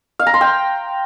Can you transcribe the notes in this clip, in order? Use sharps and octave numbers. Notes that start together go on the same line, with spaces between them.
F5
A#5
C6
G5